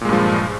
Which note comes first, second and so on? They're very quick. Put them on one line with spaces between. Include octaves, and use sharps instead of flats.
A#2 G#3 G2 F3